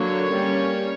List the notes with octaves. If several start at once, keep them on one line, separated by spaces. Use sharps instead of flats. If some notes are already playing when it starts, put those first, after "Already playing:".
Already playing: D3 F#3 A#3 D4 C#5
G3 A#3 C#4